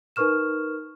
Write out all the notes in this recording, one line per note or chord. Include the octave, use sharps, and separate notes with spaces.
D#4 A#4 B4 C#6 F6 E7